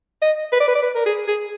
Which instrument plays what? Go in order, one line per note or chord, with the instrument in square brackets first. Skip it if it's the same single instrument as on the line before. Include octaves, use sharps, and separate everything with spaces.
[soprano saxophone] D#5
B4
D5
B4
D5
B4
A#4
G#4
G#4